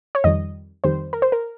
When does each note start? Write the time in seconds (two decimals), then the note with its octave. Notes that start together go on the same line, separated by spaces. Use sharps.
0.15 C#5
0.24 F2 D#3 G3 D#5
0.84 F2 D#3 G3 C5
1.13 A#4
1.22 C5
1.32 A#4